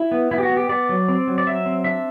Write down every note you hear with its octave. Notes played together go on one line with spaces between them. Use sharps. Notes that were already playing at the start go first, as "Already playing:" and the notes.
Already playing: E4
B3
B3 E4
G4
F#4
B3
G4
B3 D5
F#3
C4
F#3
D5
F#3 E5
C4
D4 E5